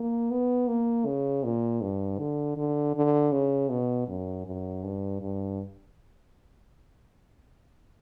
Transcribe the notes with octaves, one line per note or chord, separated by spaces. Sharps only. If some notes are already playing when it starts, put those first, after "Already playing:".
Already playing: A#3
B3
A#3
C#3
A#2
G2
D3
D3
D3
C#3
B2
F#2
F#2
G2
G2